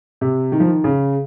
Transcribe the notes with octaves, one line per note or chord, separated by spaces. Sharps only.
C3
D#3
F3
D#3
C#3